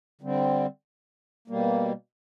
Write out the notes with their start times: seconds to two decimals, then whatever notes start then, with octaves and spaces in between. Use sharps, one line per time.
0.21 D3 G3 C4
1.48 B2 G3 A#3